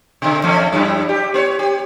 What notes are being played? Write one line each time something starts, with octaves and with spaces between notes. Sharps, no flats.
B2 D3
E2 A3 C#4
F#2 G3 E4
G4
B3 C5 C#5
G4